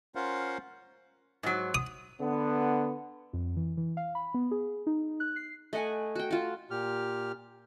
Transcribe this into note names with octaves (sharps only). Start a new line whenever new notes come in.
C#4 F4 A#4 C5 F5 F#5
G#2 F#3
D#6
D3 B3
F2
E3
E3
F5
B5
B3
G#4
D#4
F#6
C7
A3 D#5 F#5 G#5
F#4 G5
F4 F#4
A#2 G4 F6